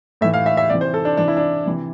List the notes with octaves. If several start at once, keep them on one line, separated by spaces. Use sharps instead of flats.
A2 E3 E5
F5
E5
E5
C3 E3 D5
C5
A4
D4
C3 E3 D4
E4
D4
C3 E3